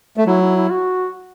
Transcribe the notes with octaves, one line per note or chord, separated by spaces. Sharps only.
A3
F#3 E4
E4
E4
F#4